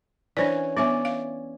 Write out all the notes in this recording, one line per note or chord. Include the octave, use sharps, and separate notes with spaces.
E3 C#4 D4 C5 D5
B3 C#4 D4 D5 E5
F5